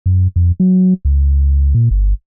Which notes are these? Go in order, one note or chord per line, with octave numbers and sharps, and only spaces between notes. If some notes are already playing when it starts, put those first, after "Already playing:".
F#2
F2
F#3
C#2
A#2
G1